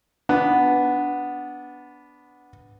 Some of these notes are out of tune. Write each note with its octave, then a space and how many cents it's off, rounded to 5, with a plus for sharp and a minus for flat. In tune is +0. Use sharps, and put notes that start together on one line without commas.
B3 +0 D4 -10